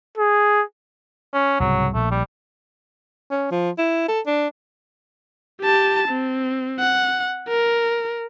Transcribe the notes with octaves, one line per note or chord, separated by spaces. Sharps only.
G#4
C#4
C2 G#2 C#3 F#3
A#1 A3
G3
C#4
F3
E4
A4
D4
G4 A5
C4
F#5
A#4